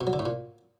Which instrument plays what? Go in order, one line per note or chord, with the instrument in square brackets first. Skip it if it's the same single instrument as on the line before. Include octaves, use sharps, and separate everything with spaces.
[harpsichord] B2
F#3
D3
A2
A#2